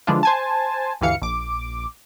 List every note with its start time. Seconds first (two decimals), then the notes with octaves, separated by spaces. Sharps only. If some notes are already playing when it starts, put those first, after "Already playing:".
0.07 D3 E3 F3 G#3 D4 F4
0.23 C5 G#5 A5
1.01 D2 G2 E3 F5 C#7
1.22 A#1 D6